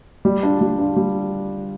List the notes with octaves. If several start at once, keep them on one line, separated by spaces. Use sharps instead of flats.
G3
D4 F4
G3
D4 F4
G3